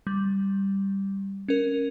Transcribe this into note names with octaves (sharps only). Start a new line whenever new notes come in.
G3
C#4 A#4